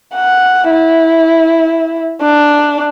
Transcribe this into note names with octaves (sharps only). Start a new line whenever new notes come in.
F#5
E4
D4